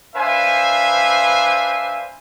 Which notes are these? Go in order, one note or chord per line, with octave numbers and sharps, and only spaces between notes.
D4 B4 C5 E5 F5 G#5